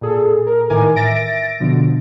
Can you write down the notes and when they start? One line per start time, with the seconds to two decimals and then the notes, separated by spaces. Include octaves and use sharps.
0.01 A#2 G#4 A4
0.47 A#4
0.70 A2 D#3 E3 A#4 G#5 D6
0.96 E5 A6 A#6 D7
1.60 B2 D3 F3